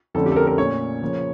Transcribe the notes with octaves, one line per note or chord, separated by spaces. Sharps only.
F2 D3 A3 C#4 A4
G4
A4
A#4
A#4
A#2 A3 C#4 C#5
C#3 F3 A#3